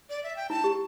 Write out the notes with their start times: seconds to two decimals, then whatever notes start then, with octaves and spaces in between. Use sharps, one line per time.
0.09 D5
0.24 E5
0.36 G5
0.50 E4 A5
0.64 G4